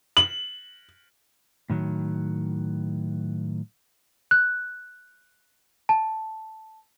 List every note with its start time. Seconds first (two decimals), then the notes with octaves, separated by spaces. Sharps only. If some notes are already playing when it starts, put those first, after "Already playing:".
0.17 F#7
1.70 A2 D#3 F#3
4.31 F#6
5.89 A5